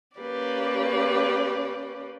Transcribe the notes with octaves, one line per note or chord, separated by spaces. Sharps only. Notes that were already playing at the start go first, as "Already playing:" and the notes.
A#3 C#4 G4 B4 D5